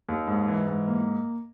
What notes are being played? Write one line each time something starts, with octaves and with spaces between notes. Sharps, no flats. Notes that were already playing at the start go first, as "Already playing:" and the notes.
D#2
G#2
E3
G#2
A#3